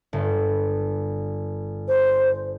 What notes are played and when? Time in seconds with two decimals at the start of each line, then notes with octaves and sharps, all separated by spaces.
0.13 G1
1.88 C5